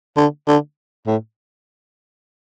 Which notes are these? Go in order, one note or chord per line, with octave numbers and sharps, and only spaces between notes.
D3
D3
A2